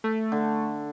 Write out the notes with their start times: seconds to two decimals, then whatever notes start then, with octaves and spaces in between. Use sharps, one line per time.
0.04 A3
0.32 D3